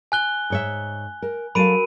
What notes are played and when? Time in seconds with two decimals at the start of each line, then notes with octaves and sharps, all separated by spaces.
0.12 G#5 F#6 G7
0.50 G#2 C#5 E5
1.22 A#4
1.55 F#3 F#4 A4 A#4 F5 B5 D7 D#7